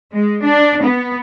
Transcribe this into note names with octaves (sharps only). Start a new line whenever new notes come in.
G#3
D4
B3